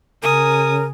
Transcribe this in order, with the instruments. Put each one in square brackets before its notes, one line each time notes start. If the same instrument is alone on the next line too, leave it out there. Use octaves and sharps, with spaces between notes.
[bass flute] C#3 [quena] A#4 [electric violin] G#5 D#6